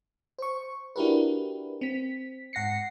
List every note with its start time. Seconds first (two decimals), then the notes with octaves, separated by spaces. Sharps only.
0.38 C5 C#6
0.96 D4 E4 F#4 G4 A#4 B4
1.81 C4 B6
2.53 G#2 F#5 A#6 C7 C#7